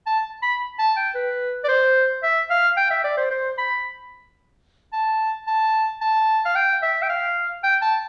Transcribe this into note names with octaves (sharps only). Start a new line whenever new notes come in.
A5
B5
A5
G5
B4
D5
C5
E5
F5
G5
E5
D5
C5
C5
B5
A5
A5
A5
F5
G5
E5
G5
F5
G5
A5